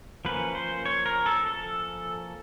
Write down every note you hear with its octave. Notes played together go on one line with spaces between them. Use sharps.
F3 A#3 C#4 B4
C5
C#5
A#4
A4
A4